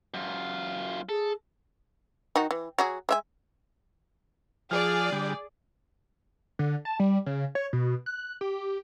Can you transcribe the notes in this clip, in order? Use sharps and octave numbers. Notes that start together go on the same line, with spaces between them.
F#2 F4
G#4 A4
D#3 D#4 F#4
E3
F#3 F#4 G#4
G#3 E5 G#5
F3 G#4 D5 F6
D3 G3
D3
A5
G3
C#3
C#5
B2
F#6
G4